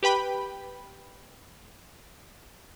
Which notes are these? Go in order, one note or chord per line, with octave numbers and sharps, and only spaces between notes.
G4 B4 G5 B5